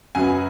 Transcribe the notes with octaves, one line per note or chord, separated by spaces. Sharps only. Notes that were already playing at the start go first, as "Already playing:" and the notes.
F#2 C#3 F#3 B3 G#5